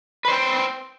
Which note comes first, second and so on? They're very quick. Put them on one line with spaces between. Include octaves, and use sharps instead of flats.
B4 C5 G5